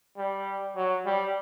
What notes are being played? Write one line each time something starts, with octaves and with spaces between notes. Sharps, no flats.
G3
F#3
G3